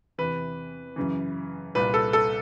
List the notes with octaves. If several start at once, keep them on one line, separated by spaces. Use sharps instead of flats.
E2 C3 E3 B4
F#2 C#3 E3
C2 A#2 B4
A4
A4